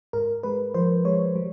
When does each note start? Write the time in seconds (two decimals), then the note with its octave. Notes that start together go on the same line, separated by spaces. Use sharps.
0.13 G#2 A#4
0.43 G#3 B4
0.74 F3 C5
1.05 G#3 C#5
1.36 G3